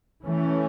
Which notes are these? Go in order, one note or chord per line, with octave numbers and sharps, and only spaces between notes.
E3 A3 C#4